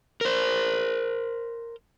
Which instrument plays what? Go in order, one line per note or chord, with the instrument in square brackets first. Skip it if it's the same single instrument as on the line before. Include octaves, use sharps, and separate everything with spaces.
[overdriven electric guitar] A#4 C5